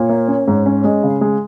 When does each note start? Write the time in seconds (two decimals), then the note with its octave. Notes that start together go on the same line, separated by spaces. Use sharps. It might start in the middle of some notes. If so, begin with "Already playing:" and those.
Already playing: A#2 C#5
0.09 A#3
0.28 C#4
0.47 G#2
0.66 C#4
0.84 G#3 D#5
1.03 C#3
1.09 F5
1.21 G#3